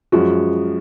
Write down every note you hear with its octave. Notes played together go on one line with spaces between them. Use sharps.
F#2 F3 G#3 F#4